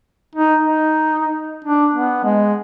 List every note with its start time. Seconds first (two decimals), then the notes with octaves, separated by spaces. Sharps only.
0.36 D#4
0.64 D#4
1.64 D4
1.94 B3
2.24 G#3